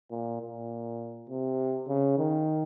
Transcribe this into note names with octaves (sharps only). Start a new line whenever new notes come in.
A#2
A#2
C3
C#3
D#3